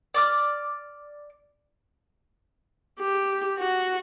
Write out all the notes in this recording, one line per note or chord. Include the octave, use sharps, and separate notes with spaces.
D5 D6 F6
G4
F#4